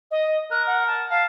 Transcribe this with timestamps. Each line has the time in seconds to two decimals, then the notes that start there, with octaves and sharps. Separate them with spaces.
0.11 D#5
0.51 A#4 F#6
0.67 F#5
0.87 A5
1.10 F5 A5